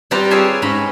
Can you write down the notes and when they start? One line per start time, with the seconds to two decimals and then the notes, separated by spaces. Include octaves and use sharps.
0.11 G3 C4 F4 G4 B4 A#5
0.31 G#4 C#5 E5 F5 G#5 A5
0.62 G#2 C#4 A#5 B5